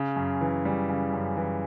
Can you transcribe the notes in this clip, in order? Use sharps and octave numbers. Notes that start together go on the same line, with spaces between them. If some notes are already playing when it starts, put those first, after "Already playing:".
Already playing: C#3
F#2
E3
G3
C#3
F#2
E3